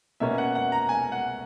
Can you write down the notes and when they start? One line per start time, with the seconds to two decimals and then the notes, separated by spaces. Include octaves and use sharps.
0.20 B2 A#3 C#4 E5
0.38 F#5
0.55 F#5
0.72 A#5
0.89 G#5
1.12 F#5